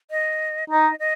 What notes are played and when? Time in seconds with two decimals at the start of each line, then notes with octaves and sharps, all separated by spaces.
0.11 D#5
0.70 D#4 D#5
1.00 D#5